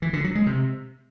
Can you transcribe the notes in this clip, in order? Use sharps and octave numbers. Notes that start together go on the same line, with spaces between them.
E3
D3
F#3
G#3
C3